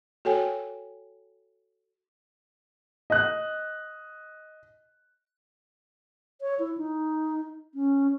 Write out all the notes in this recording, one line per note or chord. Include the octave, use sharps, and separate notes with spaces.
F#4 A4 C#5 G5 G#5
D#5 F#6
C#5
E4
D#4
C#4